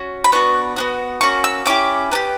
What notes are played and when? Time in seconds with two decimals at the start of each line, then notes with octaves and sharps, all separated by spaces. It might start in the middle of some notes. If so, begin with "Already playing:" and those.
Already playing: C#4 F#4
0.24 B5
0.32 B3 D4 F#4 C#6
0.76 B3 D4 F#4
1.21 A#3 C#4 F#4 C#6
1.44 E6
1.66 C#4 E4 G4 D6
2.12 B3 D4 G4